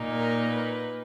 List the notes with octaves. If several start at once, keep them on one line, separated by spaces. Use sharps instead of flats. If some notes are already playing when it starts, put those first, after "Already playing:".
Already playing: A#2 A#3 D#4
A#4
B4